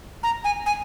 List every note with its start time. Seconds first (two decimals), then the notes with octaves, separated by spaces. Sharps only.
0.23 A#5
0.44 G#5
0.66 G#5